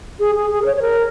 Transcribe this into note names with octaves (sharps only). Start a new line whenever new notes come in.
G#4
G#4
G#4
A#4
C#5
C#5
A#4